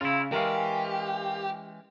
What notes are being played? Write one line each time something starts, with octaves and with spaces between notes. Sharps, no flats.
C#3 E4 F4
E3 G#3 C#4 G4 A#4 F5